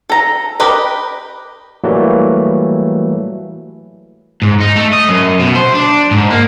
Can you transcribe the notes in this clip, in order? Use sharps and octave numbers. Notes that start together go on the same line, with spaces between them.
A4 A#5
G4 A#4 B4 D#5
E3 F#3 G3 A3 A#3
G#2
D#4
A3
D#5
F#2
B2
C5
D4
G#2
A#3